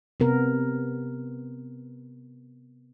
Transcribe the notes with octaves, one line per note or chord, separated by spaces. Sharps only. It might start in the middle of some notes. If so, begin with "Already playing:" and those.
C3 B3 A#4